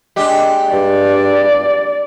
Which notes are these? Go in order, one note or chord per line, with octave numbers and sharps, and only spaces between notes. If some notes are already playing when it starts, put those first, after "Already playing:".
G#3 D4 G4
G2 D5